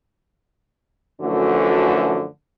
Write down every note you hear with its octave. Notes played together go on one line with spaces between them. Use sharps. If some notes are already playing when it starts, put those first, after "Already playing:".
F#2 D3 E3 F3 A3 F#4